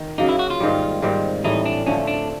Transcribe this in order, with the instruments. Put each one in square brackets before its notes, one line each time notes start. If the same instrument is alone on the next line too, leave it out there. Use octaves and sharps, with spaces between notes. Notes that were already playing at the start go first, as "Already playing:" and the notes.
Already playing: [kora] D#3
[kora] C#3 F#3 A#3 [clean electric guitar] D#4
[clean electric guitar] E4
F#4
F4
[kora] G#2 D#3 G3
G#2 D#3 G3 C4
[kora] A2 E3 G3 [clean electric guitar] D#4
[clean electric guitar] D4
[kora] D3 F3 A3 [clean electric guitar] C#4
[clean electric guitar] D4